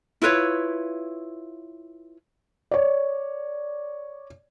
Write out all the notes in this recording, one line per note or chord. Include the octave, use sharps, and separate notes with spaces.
E4 F4 B4 C#5
C#5 D5